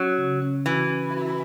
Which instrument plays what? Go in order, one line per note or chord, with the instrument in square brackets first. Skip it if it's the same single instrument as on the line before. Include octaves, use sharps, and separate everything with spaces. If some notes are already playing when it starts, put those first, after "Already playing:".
Already playing: [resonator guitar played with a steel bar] F#3 [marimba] C#4
[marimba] C#3
C#4
[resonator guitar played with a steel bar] E3 [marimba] F#4
[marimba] C#4
F#4